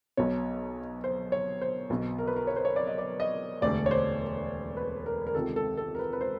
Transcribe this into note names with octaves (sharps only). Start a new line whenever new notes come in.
B1 B2 C#5
C5
C#5
C5
B1 B2
A#4
B4
A#4
C#5
C5
C#5
D5
D#5
D5
D#5
E1 D2 D3 D5
C#5
C5
B4
A#4
A#4
C#2 C3 D#3 A4
A4
A4
A#4
B4
B4
C5